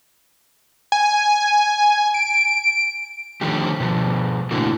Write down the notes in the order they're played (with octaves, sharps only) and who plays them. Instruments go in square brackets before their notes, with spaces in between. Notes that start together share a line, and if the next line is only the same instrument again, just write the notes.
[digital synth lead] G#5
D7
[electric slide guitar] D3 D#3 F3 A3 G4
B2 F3
A2 D3 A#3 E4 F#4